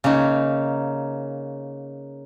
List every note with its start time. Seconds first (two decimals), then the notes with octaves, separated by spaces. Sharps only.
0.04 C#3 A#3 C#4 D#4